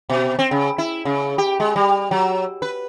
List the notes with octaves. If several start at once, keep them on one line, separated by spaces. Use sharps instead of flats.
B2
C4
C#3
E4
C#3
G4
G#3
G3
F#3
B4